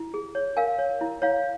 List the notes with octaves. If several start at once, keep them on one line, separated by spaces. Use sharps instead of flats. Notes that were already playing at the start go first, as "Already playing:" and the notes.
Already playing: E4
G#4
C#5
A#4 F5 G#5
C#5
E4
E4 C#5 F5